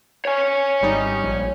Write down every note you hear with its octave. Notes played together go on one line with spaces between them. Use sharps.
C#5 G#5
G#1 G3 D#4
A#1